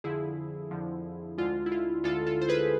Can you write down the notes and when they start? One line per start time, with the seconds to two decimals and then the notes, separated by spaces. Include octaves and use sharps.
0.04 F2 D3 F3 E4 G#4
0.71 F2 D3 F3
1.38 D2 D3 G#3 F4
1.66 E4
1.72 F4
2.04 D2 D3 G#3 F4 A4
2.27 F4 A4
2.41 C5
2.49 G#4 B4